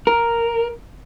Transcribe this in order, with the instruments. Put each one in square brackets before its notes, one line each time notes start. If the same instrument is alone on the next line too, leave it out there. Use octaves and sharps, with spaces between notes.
[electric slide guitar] A#4